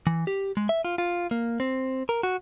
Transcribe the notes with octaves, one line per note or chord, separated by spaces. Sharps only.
E3
G4
G#3
E5
F4
F4
A#3
C4
A#4
F#4